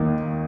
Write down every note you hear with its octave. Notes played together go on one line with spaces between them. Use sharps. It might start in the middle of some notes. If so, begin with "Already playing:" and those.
Already playing: D#2 D#3 A#3